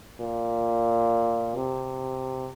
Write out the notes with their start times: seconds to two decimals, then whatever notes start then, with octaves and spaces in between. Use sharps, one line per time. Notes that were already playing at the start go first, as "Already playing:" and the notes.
0.20 A#2
1.55 C3